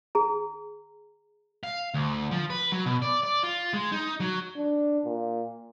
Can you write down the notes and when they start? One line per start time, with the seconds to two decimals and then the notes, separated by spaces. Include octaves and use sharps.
0.15 G#4 A#5
1.63 F5
1.94 D2
2.31 F3
2.50 B4
2.72 F#3
2.86 B2
3.02 D5
3.23 D5
3.43 F4
3.73 G#3
3.92 D#4
4.20 F#3
4.57 D4
5.05 A#2